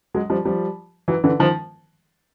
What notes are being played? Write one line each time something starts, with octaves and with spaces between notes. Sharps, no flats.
F#3 G#3
F3 G3
F3 G3
E3 F#3
D3 E3
D#3 F3